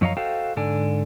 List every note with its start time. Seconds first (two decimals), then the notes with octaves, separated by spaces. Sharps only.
0.01 F#2 F3 C#5 D#5 F5 A#5
0.17 F#4 A4 C5 D#5 F5 G5
0.56 G#2 D3 A4 D5 G#5